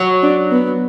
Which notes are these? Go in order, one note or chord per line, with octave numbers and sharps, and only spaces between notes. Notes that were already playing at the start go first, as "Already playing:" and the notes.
Already playing: F#3
D4
B3